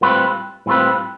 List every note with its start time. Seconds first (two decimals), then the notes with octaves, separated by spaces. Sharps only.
0.01 A2 G3 C4 F4 B4
0.66 A2 G3 C4 F4 B4